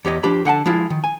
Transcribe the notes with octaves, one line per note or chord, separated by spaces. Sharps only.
E2 G4 C#5 D#5
F3 D4 G4 B5
D3 F#5 G5 A5
F3 G#3 E4 F4
D#3
G#5